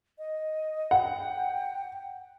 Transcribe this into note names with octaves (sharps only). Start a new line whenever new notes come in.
D#5
F#5 G5